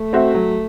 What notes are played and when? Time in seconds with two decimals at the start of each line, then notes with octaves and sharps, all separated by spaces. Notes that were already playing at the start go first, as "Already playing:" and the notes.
Already playing: A3
0.13 C4 F#4 C5 E5
0.34 F#3